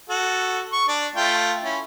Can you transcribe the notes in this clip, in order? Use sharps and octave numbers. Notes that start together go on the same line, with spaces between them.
F#4 A4
C#6
D4 D5
A3 F4 G5
C#4 E4